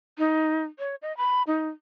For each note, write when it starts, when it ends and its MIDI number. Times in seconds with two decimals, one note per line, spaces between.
0.18 0.63 63
0.79 0.95 73
1.02 1.15 75
1.17 1.43 83
1.47 1.69 63